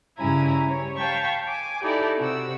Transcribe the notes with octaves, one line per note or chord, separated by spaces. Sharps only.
G2 C#3 C#4 E4 G#5 A#5
G3 C#5
C#5 F5 G5 A5 B5 C#6
G#5 D6
D#4 E4 G4 A4 D5
C3 F#4 E6